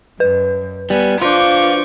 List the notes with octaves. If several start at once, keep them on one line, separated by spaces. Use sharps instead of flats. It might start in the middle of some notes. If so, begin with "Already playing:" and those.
F#2 B4
G3 B3 G#5
F3 D4 F4 C#6 D6 G6